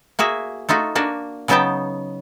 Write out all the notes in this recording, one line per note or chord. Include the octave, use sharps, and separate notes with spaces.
A#3 F#4 G#4 E5
A3 D#4 F4 F#4
A#3 D4 F#4
C#3 F#3 B3 D#4 G5 A5